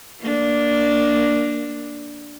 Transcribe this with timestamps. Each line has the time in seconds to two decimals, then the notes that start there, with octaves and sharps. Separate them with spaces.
0.20 A#3 D4